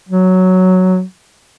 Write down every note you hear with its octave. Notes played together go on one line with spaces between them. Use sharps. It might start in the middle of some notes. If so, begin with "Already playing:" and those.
F#3